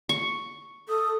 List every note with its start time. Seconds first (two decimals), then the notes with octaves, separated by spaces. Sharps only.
0.09 C#6
0.89 A4 D#6